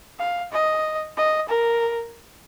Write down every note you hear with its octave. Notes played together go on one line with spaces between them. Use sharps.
F5
D#5
D#5
A#4